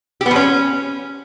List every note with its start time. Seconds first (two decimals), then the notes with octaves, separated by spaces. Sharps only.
0.21 G4
0.26 B3
0.31 F3
0.36 C#4